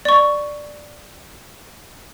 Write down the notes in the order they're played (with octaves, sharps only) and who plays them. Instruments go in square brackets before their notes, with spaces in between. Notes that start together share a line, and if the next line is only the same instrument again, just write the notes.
[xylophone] D5 C#6